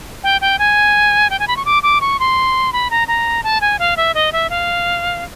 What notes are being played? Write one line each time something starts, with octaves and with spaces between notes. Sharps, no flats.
G5
G5
G#5
G5
G#5
B5
C#6
D6
D6
C#6
C6
B5
A#5
A#5
A5
G#5
F5
E5
D#5
E5
F5